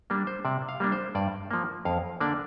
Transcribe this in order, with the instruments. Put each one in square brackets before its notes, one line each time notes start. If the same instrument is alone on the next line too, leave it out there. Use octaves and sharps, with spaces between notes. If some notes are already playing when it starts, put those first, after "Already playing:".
[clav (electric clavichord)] G3 A#3 D4
C5
C3 D5
F5
G3 A#3 D4
C5
G2 D5
F3 A#3
F2 F5
D3 A#3 D4 D5